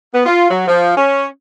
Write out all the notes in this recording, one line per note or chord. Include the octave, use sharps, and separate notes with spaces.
B3
F4
F#3
F3
C#4